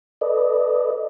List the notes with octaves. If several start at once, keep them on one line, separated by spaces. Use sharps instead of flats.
A4 B4 D5 D#5